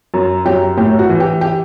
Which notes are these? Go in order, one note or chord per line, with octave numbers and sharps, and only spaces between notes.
F#2
F#2 G4
A2 G4
F#4
E3
G4
G4